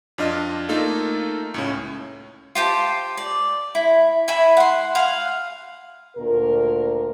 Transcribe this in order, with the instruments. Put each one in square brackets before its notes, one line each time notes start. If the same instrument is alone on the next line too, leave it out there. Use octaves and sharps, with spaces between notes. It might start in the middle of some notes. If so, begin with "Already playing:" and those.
[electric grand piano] F2 D4 F4 D#5 F6
A3 A#3 D#4 F4 A4
C#2 A2 C#4
[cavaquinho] F4 G4 C5 A5
D5
E4
E4 E5 G#5 B5
F#5 C6
F5 F#5 G#5
[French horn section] D2 A#2 A#4